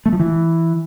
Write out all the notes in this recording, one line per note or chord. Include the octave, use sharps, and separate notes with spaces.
A3
F3
E3